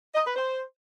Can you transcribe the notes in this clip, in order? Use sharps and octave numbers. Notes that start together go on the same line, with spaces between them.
D#5
B4
C5